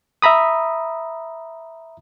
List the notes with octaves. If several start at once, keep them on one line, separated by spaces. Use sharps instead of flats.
E5 A#5 B5 D#6